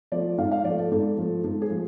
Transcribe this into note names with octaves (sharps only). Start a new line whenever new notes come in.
F3 A3 D5
G#2 F5
F5
F3 A3 D5
A4
G#2 A4
F3 A3
G#2 A4
G#4
F3 A3